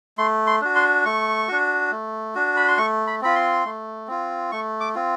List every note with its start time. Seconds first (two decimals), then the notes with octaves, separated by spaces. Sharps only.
0.18 A3 C6
0.47 C6
0.61 D4 F#4
0.75 C6
1.05 A3 C#6
1.48 D4 F#4
1.91 A3
2.35 D4 F#4
2.57 B5
2.68 C6
2.77 A3 C#6
3.07 B5
3.21 C4 F4 B5
3.36 C6
3.65 A3
4.08 C4 F4
4.52 A3 C#6
4.80 D6
4.95 C4 F4